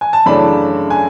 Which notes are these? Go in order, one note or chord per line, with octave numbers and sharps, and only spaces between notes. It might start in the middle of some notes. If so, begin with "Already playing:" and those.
G#5
A5
F#2 C#3 E3 A3 D4 B5
G#5